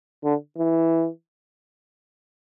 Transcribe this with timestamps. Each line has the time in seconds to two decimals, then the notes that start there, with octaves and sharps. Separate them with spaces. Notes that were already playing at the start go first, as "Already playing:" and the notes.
0.24 D3
0.58 E3